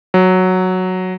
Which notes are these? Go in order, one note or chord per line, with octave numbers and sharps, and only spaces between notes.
F#3